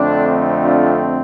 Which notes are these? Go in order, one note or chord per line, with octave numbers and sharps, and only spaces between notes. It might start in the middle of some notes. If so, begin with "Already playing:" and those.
Already playing: F2 D3 A3 C4 D4
D4 F4